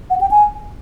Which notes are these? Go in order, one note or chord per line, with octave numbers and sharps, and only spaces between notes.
F#5
G5
G#5